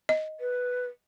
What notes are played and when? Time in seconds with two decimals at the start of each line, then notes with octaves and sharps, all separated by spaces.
0.09 D#5
0.40 B4